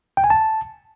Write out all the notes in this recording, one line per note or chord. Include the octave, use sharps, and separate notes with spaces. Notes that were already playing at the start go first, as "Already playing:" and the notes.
G5
G#5
A5